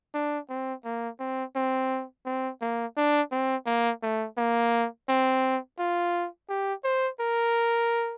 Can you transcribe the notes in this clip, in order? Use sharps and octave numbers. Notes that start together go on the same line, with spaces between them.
D4
C4
A#3
C4
C4
C4
A#3
D4
C4
A#3
A3
A#3
C4
F4
G4
C5
A#4